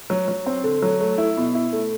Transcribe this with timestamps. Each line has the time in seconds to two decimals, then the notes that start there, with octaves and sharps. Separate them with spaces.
0.10 F#3
0.28 F#3
0.46 C4
0.64 D3
0.82 F#3
1.01 A3
1.18 E4
1.37 B2
1.55 E4
1.73 A3